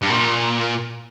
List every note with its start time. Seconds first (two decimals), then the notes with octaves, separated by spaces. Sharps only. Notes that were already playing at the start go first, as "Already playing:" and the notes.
0.02 G2
0.10 A#2